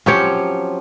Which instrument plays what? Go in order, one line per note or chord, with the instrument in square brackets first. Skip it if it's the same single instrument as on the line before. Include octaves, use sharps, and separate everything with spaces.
[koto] F3 F#3 C4 [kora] C#4 G4 C#5